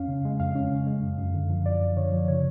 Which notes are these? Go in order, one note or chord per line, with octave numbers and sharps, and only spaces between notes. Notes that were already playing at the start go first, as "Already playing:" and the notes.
Already playing: F2 C#4 F5
C#3
G#3
F2 F5
C#4
C#3
G#3
F#2
F#2
D3
F3
F#2 D5
F#2
D3 C#5
F3
C#3 C#5